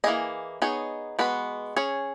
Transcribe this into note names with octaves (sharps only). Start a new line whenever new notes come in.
E3 A#3 E4 G#4 D#5
B3 D#4 G#4 C#5
G#3 B3 F#4 B4
C#4 G#4 C#5